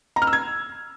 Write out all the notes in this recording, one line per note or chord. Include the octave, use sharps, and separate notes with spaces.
A#5
F6
E6
G#6